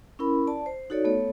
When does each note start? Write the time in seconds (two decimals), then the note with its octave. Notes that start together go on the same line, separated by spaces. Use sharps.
0.19 C#4 E4 A#4 B5
0.47 D5 A5
0.66 C5
0.90 D#4 F#4 A4 C#5 D5
1.04 A3 B3 A4 C#5